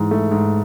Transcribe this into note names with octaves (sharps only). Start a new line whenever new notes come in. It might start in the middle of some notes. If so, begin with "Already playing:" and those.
Already playing: G#2 E3
A3
G#2